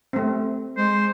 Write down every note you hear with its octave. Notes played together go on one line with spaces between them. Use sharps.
A3 C4
G#3 C5